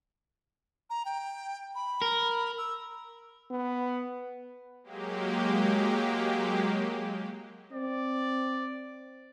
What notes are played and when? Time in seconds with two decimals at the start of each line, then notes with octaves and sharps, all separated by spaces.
0.90 A#5
1.05 G5
1.75 B5
2.02 A#4
2.58 E6
3.51 B3
4.84 F#3 G#3 A#3 G4
7.73 C4 D5